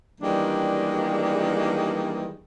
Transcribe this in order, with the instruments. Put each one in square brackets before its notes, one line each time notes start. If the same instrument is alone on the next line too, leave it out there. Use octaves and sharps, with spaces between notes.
[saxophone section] D#3 E3 G3 G#3 A#3 D4